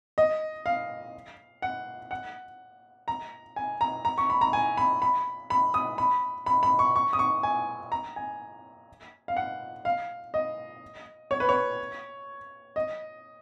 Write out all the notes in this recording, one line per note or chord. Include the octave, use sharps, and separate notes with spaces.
D#5
F5
F#5
F#5
A#5
G#5
A#5
A#5
C#6
B5
A#5
G#5
B5
B5
B5
D#6
B5
B5
B5
C#6
C#6
D#6
C#6
G#5
A#5
G#5
F5
F#5
F5
D#5
C#5
B4
C#5
D#5